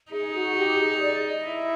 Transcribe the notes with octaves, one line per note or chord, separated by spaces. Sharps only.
D#4 G#4
F#4
G4
G#4
D5
D#5
E4